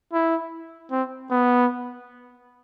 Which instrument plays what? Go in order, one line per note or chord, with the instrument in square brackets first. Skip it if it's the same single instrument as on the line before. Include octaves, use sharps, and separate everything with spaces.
[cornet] E4
C4
B3